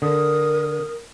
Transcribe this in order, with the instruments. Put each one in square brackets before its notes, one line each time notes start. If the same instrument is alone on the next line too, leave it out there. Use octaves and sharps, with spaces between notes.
[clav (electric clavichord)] D3 [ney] A#4 [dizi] D#6